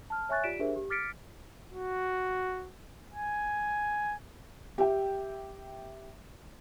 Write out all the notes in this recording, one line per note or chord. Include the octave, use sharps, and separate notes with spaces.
A5 F6
C#5 E5 G#5 C#6 F#6 A6
F4 G4 D5 B6 D7 E7
D4 G4 G#4 A#4 C5 E5
G4
D6 F6 A6 B6 C#7 D7
F#4
G#5
G4 E5 G5